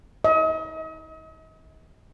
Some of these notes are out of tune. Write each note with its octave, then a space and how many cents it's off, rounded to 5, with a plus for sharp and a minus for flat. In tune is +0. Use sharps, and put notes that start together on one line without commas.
D#5 +40